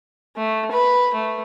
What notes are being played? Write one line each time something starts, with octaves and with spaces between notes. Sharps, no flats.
A3
B4
A3